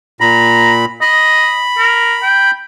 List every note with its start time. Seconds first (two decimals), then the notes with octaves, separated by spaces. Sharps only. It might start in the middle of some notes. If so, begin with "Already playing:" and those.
0.21 A#2 A#5 B5
1.01 D#5 B5
1.78 A#4
2.23 G5